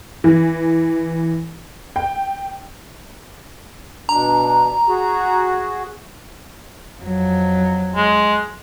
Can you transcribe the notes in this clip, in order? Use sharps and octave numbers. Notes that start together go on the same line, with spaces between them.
E3
G5
B2 D4 A#5
F#4 G#4
F2 F#3
G#3